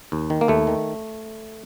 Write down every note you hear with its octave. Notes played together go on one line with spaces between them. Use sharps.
D#2
D#3
A#3
D#2 A3
D#3